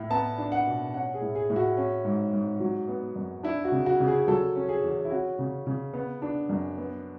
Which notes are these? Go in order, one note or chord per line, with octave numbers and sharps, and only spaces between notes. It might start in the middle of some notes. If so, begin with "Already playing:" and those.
Already playing: A2
B3 A5
D4
F#5
B2
C#4 F#5
G#4
A2
G#4
A2
F#4
C#4
G#2
G#2
F#3
B3
F#2
D4 E4
F#4
C#3
F#4
C#3
G#4
F#3 A4
C#4
G#4
E2
E4
C#4 F#4
C#3
C#3
B3
D4
F#2
B3